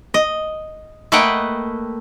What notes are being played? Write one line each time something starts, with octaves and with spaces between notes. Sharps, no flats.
D#5
A3 A#3 B4 D#5 F#5 G5